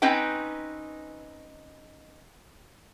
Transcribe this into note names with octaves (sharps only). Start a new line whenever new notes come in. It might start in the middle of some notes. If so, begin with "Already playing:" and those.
C4 C#4 D#4 B4 G5